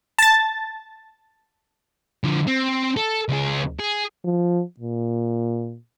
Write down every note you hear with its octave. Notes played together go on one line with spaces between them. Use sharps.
A5 A6
D3 F3
C4
A4
C#2 G#4
G#4
F3
A#2